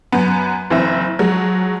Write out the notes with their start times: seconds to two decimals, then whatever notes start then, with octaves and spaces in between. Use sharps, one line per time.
0.12 F#2 B3
0.70 F#1 E3 C4 E5
1.19 F3 F#3 G#3